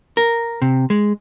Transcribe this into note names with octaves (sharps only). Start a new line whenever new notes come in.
A#4
C3
G#3